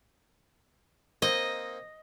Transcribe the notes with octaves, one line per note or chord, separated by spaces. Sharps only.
A#3 C4 D#4 D#5